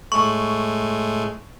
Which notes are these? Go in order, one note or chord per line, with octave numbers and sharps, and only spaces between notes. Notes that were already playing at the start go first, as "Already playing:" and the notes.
A2 G#3 A3 C#6